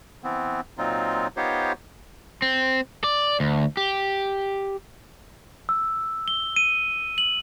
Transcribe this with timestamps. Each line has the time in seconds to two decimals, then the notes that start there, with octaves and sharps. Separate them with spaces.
0.23 E3 B3 C4
0.78 A#2 F#3 C4 D#4 F4
1.37 B3 D#4 F4 G4 C5 C#5
2.42 C4
3.04 D5
3.40 D2
3.77 G4
5.69 E6
6.28 G7
6.56 D#7
7.18 F#7